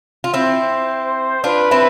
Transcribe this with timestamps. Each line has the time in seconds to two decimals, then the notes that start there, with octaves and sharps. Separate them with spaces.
0.24 F4
0.33 C4 E4 C5
1.44 D4 F4 B4
1.71 C4 E4